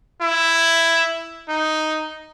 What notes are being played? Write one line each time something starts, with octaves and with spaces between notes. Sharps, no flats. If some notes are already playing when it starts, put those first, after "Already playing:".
E4
D#4